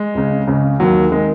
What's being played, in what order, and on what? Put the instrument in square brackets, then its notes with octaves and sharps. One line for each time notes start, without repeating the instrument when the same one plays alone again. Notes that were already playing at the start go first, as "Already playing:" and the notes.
Already playing: [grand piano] G#3
C#2 C#3
C#2 C#3
D#2 D#3 F#3
D#3 G#3